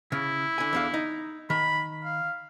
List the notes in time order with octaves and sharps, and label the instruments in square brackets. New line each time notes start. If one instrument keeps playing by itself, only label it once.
[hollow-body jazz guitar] C#3 [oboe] E4
[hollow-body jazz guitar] D3 G#5
E2 D3 F5
D#4
[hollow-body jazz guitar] D#3 [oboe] B5
[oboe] F5